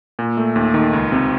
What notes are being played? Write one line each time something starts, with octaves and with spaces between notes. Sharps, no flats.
A#2
A3
D#2
D#3
C#2
C3